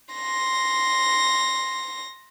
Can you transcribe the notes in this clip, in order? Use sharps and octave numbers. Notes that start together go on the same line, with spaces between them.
C6 A#6